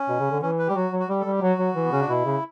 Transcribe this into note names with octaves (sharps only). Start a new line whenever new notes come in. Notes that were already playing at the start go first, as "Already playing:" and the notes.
Already playing: C#4
B2
C#3
D3
E3 C#4
B4
G3 G4
F#3 F#4
F#3
F#4
G3 G4
A4
G3
G4
F#3 F#4
F#3
E3
B3
C#3 C#4
D4
B2 E4
C#3